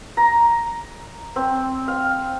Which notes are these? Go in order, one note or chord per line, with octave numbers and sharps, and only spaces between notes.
A#5
C4
F5